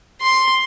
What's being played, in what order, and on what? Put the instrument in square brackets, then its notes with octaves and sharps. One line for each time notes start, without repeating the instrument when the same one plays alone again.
[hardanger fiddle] C6